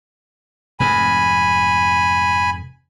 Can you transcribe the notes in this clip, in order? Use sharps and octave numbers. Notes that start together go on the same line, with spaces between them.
F1 F2 G#2 G#5 B5